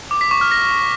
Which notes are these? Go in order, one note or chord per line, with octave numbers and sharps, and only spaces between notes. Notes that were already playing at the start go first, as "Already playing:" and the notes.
D6
B6
C#6
F6
A#6